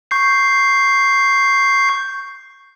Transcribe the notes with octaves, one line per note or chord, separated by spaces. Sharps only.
C#6 G6 C7